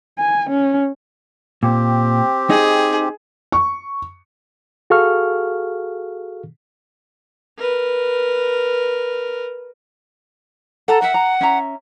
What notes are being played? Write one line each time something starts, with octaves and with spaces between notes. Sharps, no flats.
G#5
C#4
A#2 C4 G4
D#4 G#4 D#5
C#6
F#4 G#4 A4 F5 C#6 F6
A#4 B4
A4 F#5 A#5
A#4 E5 F#5
A#5
C#4 E5 A#5